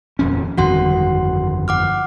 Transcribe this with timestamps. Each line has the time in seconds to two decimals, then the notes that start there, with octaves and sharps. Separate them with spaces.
0.19 D#1 F2 C#4
0.58 G1 F2 D#3 F#4 F#5 C6
1.68 F#5 D6 F6